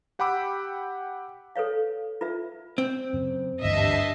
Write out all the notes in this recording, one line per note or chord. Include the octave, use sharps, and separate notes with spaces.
G4 F#5 G5 B5 D6 E6
A4 B4 C#5 F5
F4 B4 E5
C4
F#2 C#3
G#1 D2 G2 E3 D#5 E5 A5 C7